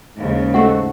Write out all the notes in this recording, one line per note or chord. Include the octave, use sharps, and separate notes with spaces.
D#2 G#2 C#3
A3 F#4 G4 A4 F#5